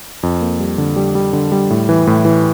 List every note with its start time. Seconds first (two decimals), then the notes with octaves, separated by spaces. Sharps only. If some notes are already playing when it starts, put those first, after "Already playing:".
0.23 F2
0.41 A#3
0.60 G3
0.78 D3
0.96 G3
1.15 G3
1.33 D3
1.52 G3
1.70 A2
1.89 E3
2.07 A2
2.25 E3